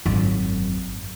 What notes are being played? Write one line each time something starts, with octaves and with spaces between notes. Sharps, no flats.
G#1 F#2